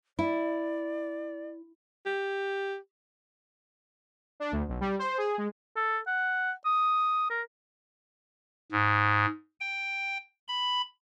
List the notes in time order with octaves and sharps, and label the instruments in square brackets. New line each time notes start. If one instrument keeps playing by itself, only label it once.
[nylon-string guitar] E4 [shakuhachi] D5
[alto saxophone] G4
[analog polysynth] D4
D2
B1
G3
C5
G#4
G#3
[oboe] A4
F#5
D#6
A#4
[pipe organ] G#2
G5
B5